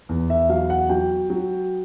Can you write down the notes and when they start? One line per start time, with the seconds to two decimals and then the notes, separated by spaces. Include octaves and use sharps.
0.09 E2
0.30 E5
0.49 F#3 F5
0.70 F#5
0.89 F#3 G5
1.30 F#3